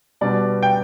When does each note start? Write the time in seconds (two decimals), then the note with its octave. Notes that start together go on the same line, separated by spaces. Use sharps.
0.21 B2 G3 B3 D4 D5
0.63 G5